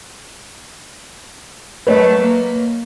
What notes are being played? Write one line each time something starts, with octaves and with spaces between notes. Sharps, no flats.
F#3 A3 B4 C#5 D#5
A#3